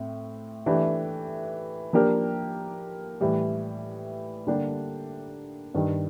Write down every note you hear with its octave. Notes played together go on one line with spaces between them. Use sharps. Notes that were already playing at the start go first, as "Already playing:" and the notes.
Already playing: A2 C4
E3 A3 D4 G4
F3 A#3 D4 G4 A#4
A2 E3 G3
D3 G3 A#3 D4 G4
G2 D#3 G3